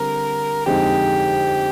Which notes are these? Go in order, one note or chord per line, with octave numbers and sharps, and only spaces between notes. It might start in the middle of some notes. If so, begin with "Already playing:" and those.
Already playing: D3 G3 C4 A#4
F2 D3 G#3 D#4 G4